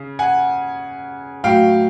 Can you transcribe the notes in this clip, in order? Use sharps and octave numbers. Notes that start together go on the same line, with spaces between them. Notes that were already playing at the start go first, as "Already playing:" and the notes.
Already playing: C#3
F#5 G#5
A2 F#3 F5 G5